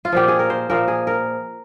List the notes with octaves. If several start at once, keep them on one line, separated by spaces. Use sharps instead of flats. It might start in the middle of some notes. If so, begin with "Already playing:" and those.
F4
A#2 F3 G4
G#4
A#4
C5
A#2 F3 A#4
G#4
A#4